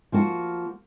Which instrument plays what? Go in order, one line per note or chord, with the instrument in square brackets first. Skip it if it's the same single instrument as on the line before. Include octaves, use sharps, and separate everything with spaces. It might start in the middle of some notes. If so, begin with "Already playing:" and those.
[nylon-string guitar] F3 A#3 F#4